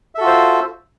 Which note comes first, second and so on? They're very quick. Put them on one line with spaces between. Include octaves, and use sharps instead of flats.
E5 A4 F#4 F4 C5